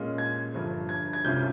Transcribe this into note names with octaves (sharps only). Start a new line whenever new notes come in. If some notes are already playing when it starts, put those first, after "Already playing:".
Already playing: A#2 G#3 C#4 F4
G#6
G1 G2 F3
G#6
G#6
C2 C3 G3 C#4 F4 G6